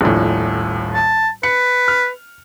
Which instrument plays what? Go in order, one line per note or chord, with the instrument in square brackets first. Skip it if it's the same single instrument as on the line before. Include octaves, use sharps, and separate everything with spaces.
[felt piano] D#1 A#1 A2
[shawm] A5
[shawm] B4 [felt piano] C#7
[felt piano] F6